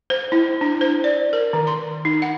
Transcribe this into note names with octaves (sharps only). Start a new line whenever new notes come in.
C5
E4
D4
C5
D5
A#4
D#3
C6
D#4
F#5